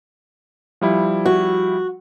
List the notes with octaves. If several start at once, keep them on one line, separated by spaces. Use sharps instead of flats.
F3 G3 E4
F#4